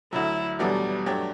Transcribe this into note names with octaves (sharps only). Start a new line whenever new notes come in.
D2 D3 F#3 E4
E2 B2 F#3 G3 A3 D4
G2 F#3 A3 D4 G4